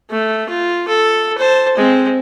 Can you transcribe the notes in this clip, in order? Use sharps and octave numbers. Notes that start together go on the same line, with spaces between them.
A3
F4
A4
C5 A5
G#3 C4